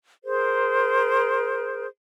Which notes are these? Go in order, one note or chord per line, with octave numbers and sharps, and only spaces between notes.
G#4 A#4 C5